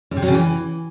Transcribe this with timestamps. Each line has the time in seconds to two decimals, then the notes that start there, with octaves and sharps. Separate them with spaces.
0.11 F#2
0.17 C3
0.22 F#3
0.28 C#3
0.33 E3